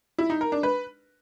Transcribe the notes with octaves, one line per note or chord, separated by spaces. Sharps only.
E4
D#4
A#4
D4
B4